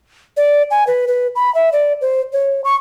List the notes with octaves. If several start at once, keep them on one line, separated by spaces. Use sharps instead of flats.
D5
G#5
B4
B4
B5
E5
D5
C5
C#5
C#6